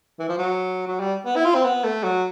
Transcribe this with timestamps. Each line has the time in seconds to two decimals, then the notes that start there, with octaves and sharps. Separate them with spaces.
0.19 E3
0.29 F3
0.38 F#3
0.87 F#3
1.00 G3
1.26 B3
1.36 E4
1.45 F4
1.55 C4
1.64 B3
1.84 A3
2.04 F#3